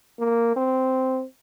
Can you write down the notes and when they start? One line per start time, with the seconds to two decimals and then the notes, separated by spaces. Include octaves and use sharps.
0.19 A#3
0.56 C4